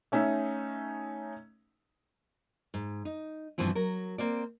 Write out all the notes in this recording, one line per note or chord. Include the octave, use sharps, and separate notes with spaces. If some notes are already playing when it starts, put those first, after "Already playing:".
A3 C#4 D#4 E5
G#2
D#4
G2 B2 E3 F3 C4
F#3 A#4
A#3 C4 D5